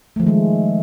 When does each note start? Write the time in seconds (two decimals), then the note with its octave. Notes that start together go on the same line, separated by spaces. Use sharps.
0.16 A3
0.20 F3
0.23 D#3
0.27 G#3